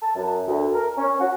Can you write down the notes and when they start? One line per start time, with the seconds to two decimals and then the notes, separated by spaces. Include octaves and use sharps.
0.02 A5
0.15 F#2
0.47 D2
0.73 A#4
0.97 C#4
1.20 F#4